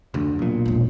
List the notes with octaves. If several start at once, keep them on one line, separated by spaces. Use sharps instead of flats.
F1 D2 D4
B1 A#2
E1 A#1